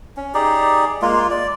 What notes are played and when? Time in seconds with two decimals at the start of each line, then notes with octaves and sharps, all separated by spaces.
0.17 C#4
0.34 D#4 G4 G#4 D5
1.02 G#3 A#3 F4
1.31 D5